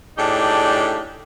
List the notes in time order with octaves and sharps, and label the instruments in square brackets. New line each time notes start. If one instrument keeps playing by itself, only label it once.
[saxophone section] A2 D4 D#4 G4 G#4 D5